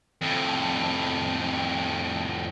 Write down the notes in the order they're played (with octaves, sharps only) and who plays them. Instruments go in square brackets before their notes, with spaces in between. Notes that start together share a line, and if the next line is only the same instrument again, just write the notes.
[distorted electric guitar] F2 A2